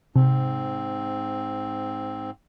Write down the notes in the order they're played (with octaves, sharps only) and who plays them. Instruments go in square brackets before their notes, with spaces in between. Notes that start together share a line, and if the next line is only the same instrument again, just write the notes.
[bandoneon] G#2 C4 [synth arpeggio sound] C3